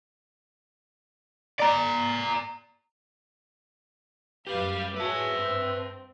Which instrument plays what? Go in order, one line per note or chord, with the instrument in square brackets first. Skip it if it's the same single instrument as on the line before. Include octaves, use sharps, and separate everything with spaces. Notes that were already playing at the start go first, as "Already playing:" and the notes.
[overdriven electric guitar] D5 A#5
[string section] F#2 B4 F5 [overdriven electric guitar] G3 G4
[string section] F#4 G#4 C#5 [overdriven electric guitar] B4 A5 [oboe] E5
[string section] G2 C4